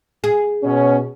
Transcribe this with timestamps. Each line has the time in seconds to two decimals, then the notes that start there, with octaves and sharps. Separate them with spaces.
0.24 G#4
0.63 B2 C#4